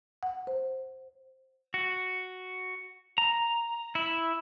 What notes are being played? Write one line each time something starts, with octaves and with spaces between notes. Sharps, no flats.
F#5
C5
F#4
A#5
E4